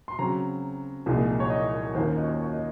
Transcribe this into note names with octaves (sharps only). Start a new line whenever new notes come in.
C6
C#3 F#3 C4 A#5
C2 A#2 F3 G#3 D#4
C#5
D#5
D#2 D#3 A#3 C#4 F4 C5
D#5
C#5
C#5
D#5